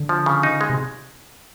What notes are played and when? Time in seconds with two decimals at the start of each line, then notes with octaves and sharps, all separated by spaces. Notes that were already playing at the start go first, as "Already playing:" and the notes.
Already playing: D3
0.09 F3
0.26 C#3
0.43 D#4
0.61 G#3
0.70 C3